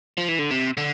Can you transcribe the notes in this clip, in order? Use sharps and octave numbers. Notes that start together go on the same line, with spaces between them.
F3
E3
D3
C3
D3